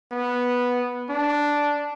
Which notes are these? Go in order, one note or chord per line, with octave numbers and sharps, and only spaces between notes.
B3
D4